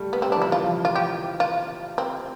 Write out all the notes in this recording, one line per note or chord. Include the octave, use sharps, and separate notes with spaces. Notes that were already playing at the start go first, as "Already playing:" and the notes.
Already playing: G3 A3
B3
G3 C4
D4
F3
E4
E3 F4
F3
F4
G4
F4
C4